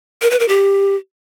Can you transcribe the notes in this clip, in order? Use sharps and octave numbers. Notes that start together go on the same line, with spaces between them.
A#4
B4
A#4
G4